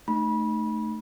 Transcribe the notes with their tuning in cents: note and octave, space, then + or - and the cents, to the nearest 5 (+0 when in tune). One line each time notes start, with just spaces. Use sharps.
A3 +0 D#4 -30 B5 -30